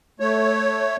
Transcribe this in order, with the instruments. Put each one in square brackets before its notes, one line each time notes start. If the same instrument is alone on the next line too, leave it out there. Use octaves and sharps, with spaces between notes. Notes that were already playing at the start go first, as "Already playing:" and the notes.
[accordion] A3 C#5